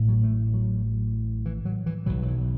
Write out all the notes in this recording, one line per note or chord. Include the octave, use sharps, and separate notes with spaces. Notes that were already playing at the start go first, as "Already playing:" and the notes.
Already playing: A1 A2
F#3
A3
F#3
E3
F#3
E3
B1 B2 F#3
F#3
E3